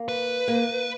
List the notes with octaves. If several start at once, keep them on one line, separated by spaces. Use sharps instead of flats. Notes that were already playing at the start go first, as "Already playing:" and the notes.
Already playing: A#3
B4
A#3